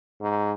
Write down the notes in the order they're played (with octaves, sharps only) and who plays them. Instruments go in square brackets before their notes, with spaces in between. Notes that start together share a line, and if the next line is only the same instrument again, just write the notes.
[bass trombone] G#2